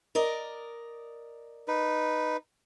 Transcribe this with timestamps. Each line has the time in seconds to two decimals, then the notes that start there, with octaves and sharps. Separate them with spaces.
0.15 A#4 D5 D#5
1.68 D#4 B4